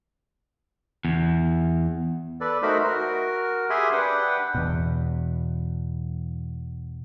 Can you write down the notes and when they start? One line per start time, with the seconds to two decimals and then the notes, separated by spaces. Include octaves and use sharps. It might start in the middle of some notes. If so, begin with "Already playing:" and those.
1.05 E2
2.41 A4 B4 D5
2.62 A3 D#4 F#4 A#4 C5 B5
2.84 F#4 A#4
3.70 G4 G#4 E5 G#5 B5 C6
3.93 D4 B4 F#5 G5
4.55 E2 B2